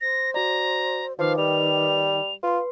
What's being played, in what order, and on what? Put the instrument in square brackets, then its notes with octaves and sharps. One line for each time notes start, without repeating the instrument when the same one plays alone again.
[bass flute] C5 [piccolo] A#6
[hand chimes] F#4 D5 [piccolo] A#5
[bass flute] D#3 [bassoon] F3 [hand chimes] B4 D6 [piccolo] F5
[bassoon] G3 [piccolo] F7
[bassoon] F4 [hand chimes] B4 C6